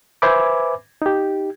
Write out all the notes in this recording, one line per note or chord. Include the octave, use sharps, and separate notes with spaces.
B4 C5 E5 G#5 B5 D6
D#4 G4